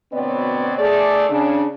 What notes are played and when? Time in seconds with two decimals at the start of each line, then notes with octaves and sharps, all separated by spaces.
0.13 D2 B2 B3 C4 C#5 D5
0.79 A3 G#4 D5
1.30 C#3 D4